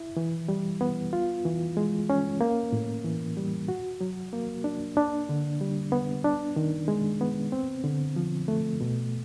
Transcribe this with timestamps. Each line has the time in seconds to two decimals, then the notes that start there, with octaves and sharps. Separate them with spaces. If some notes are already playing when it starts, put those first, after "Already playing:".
Already playing: E4
0.17 E3
0.48 G3
0.81 B3
1.13 F4
1.45 E3
1.77 G#3
2.10 C#4
2.41 A#3
2.72 A2
3.05 E3
3.37 G3
3.68 F#4
4.01 F#3
4.33 A#3
4.64 D4
4.97 D4
5.29 D3
5.61 G3
5.92 B3
6.24 D4
6.56 D#3
6.88 G#3
7.21 B3
7.52 C4
7.84 D3
8.16 F3
8.48 A3
8.81 B2